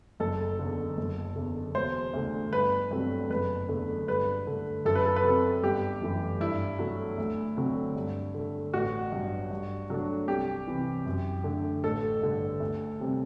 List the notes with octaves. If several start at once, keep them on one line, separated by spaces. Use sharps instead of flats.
F#1 A4
E2 D3
F#1
E2 D3
E1 C5
D2 D3
G1 B4
G2 F#3 A3 C4
F#1 B4
E2 D3 A3
G2 B4
D3 A3
F#2 A4
B4
A4
B4
F#3 C4 A4
G1 G4
F#2 E3 A3
G2 E4
F#3 A3
D2
D3 F#3 C4
G2
D3 A3
A1 F#4
G2 F#3
G2
F#3 A3 D4
C2 G4
C3 E3
F#2
D3 A3 D4
A1 A4
G2 D3 A3
D2
C3 G3 C4